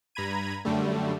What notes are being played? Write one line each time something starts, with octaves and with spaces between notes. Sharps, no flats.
G2 A#5 B5 G#6 D#7
F#2 D3 G3 A3